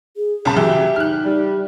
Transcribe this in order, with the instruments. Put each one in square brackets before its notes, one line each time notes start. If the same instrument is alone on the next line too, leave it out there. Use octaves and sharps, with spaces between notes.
[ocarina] G#4
[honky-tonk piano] C2 C#3 A5
[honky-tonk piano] E3 F#3 [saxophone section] G4 E5
[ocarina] D#4 [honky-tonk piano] F6 F#6
[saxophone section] G3